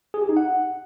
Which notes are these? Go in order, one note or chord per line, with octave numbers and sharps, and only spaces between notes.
G#4
G4
D#4
F#5